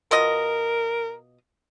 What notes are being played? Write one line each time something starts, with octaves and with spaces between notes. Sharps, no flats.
B2 F4 A#4 D#5